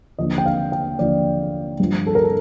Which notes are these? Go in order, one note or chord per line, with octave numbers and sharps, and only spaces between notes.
D#2 D3 F3 D#5
G5
F5
G5
D#2 D3 F3 D5
G2 F3
A4
A#4
A4